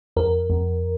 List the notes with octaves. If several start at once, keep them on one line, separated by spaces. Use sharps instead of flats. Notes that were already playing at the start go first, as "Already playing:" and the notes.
F2 A#4
F2